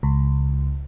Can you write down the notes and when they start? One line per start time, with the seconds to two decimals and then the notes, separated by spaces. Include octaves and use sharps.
0.03 C#2